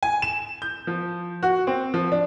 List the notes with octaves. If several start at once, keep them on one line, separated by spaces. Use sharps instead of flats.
G#5
E7
G6
F3
F#4
C4
F3
D4